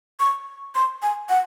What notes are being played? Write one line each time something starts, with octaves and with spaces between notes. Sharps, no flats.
C#6
C6
G#5
F#5